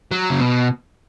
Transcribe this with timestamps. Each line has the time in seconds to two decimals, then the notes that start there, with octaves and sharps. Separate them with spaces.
0.12 F#3
0.30 C#3
0.41 B2